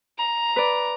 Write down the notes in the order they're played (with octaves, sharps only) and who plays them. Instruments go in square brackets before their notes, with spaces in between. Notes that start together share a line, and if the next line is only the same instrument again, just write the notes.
[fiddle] A#5
[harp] B4 D5